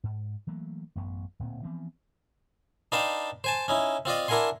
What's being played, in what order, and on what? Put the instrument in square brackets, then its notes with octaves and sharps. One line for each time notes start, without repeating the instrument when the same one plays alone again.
[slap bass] G#2
E3 F#3 A3 A#3
A1 F#2 B3
D1 A#2 C4
E3 F3 B3 C4
[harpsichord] D4 D#4 B4 F5 G5 A5
C5 G#5 A5
C#4 D#4 E4
C4 F4 D5 D#5
D4 E4 A#4 F#5 G#5 C6